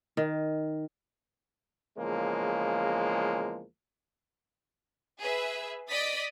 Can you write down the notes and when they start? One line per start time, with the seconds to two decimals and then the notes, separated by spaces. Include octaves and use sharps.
0.17 D#3
1.98 E2 C#3 F3 G#3 A#3
5.20 G#4 B4 E5
5.89 D5 D#5 D#6 A6 B6